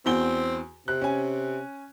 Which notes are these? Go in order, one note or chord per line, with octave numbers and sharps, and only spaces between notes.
E2 C4 F#4 G7
C3 F#6
C#4 G#5